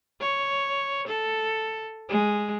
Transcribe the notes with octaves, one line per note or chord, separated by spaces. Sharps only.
C#5
A4
G#3